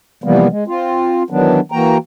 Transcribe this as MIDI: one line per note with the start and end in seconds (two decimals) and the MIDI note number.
0.24 0.48 48
0.24 0.48 52
0.24 0.48 53
0.24 0.48 55
0.24 0.48 58
0.24 0.48 59
0.50 0.64 56
0.67 1.23 60
0.67 1.23 65
1.30 1.60 51
1.30 1.60 52
1.30 1.60 54
1.30 1.60 59
1.30 1.60 62
1.72 1.97 52
1.72 1.97 58
1.72 1.97 66
1.72 1.97 79
1.72 1.97 82